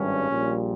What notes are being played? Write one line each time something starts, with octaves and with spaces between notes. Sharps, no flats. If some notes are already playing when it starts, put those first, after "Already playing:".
Already playing: G#1 G2 G3 C#4
A#1 A#2 G3